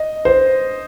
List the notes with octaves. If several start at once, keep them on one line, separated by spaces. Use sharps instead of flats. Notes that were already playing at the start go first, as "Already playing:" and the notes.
Already playing: D#5
C5